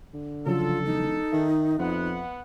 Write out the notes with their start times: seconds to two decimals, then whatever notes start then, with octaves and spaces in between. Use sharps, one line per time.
0.13 D3
0.46 C#3 F3 F#3 F4 A4
0.85 E1 D#4
1.32 D#3 E5
1.79 F2 B3 F#5